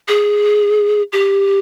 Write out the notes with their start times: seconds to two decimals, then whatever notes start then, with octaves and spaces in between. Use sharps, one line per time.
0.08 G#4
1.12 G4